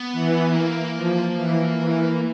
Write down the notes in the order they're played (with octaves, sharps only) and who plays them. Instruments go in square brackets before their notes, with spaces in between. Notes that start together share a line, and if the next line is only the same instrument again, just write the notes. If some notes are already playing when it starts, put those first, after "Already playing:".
Already playing: [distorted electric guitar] B3
[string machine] E3
[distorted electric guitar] A#3
[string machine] F3
E3
E3